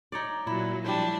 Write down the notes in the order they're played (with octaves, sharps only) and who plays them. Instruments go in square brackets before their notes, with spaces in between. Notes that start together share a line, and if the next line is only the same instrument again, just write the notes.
[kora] D#4 C#5 D5
[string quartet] A#2 F#3 [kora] E4
[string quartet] F3 D4 E4 [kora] G3 A3 C5